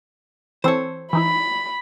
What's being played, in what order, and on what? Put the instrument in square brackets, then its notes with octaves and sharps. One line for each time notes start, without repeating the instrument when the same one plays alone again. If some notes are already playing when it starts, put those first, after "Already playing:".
[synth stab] E3 C4 A4 [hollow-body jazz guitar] C5 C#5
[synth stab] E3 D#4 E4 [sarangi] B5